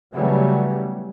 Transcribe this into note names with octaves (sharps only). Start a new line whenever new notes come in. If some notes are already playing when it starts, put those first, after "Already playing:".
C#3 E3 F#3 G3 A3 B3